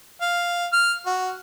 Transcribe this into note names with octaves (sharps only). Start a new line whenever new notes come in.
F5
F6
F#4